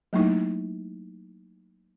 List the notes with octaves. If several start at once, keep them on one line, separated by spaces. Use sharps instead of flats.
F#3 A3 A#3 D#4 E4